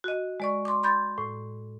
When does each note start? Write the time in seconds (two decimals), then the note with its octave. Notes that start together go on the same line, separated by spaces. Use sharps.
0.04 F#4 D#5
0.40 G#3 D5 C#6
0.65 C6 D6
0.83 B5 C6 G6 A6
1.18 A2